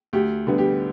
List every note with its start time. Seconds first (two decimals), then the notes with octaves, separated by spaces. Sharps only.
0.13 D2 G4
0.47 D3 G3 B3
0.58 G4